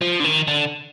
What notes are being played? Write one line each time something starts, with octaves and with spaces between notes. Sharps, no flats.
F3
D3
D#3
D3